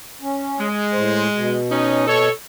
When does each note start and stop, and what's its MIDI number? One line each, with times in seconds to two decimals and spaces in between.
0.21 0.67 61
0.59 1.56 56
0.93 1.27 45
0.93 1.27 72
1.33 2.28 47
1.71 2.05 61
1.71 2.05 63
2.07 2.31 69
2.07 2.31 73